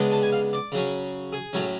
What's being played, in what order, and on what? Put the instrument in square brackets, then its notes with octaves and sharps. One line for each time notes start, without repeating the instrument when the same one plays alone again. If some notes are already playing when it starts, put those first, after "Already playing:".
Already playing: [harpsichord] C#3 G#3 B3 D4
A5
G#5
F5
D5
C#3 F#3 C#4
G#4
A2 F#3 C#4